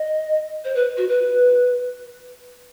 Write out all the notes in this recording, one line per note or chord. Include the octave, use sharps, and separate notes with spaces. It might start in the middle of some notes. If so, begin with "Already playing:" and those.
Already playing: D#5
C5
B4
F#4
B4